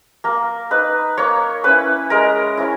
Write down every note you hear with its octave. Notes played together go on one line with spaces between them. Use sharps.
A#3 A#4
D#4 B4
A#3 C#5
C#4 E4 B4
G#3 A#4
C#4 E4